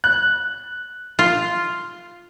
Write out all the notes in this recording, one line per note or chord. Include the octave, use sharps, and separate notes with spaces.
F#6
F4